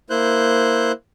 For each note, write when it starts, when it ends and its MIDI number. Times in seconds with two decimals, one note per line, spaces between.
0.10 0.92 58
0.10 0.92 64
0.10 0.92 72
0.10 0.92 90
0.10 0.92 91